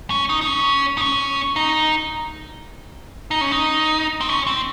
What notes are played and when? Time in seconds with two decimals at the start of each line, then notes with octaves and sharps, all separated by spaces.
0.10 C#4
0.29 D#4
0.41 D#4
0.47 C#4
0.98 D#4
1.01 C#4
1.56 D#4
3.31 D#4
3.41 C#4
3.51 D#4
4.21 C4
4.29 C#4
4.47 C4